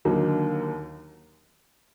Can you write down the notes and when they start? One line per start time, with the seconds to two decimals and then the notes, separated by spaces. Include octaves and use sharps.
0.05 D#2 D3 F#3 A#3 D#4